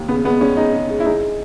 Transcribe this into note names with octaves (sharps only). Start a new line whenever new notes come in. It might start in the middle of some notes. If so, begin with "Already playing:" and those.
Already playing: D#2
C#3 B3
G#3 B3
G#3 C#4
G#3 D#4
C#3
G#3
E4
G#3 D#4